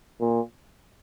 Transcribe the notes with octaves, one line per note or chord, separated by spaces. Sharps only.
A#2